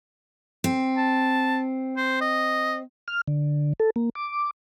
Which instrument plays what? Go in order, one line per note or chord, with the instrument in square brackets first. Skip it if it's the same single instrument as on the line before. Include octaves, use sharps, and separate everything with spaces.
[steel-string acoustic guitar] C4
[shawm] A5
C5
D#5
[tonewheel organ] F6
D3
A4
A#3
D6